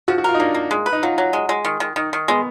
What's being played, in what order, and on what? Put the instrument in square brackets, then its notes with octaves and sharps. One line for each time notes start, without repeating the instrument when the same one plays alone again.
[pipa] F3 [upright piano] F#4
[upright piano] F#4
[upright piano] F4 [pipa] A#4
[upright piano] D#4
[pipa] A#3 [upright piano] D4
[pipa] A#3
G#3
B4
[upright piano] D#4
[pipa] F#3 [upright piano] F4
[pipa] F#3
G#3
G#3
D#3
D#3
[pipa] D#3 [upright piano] D#4
[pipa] D#3
[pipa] G#3 [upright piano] B3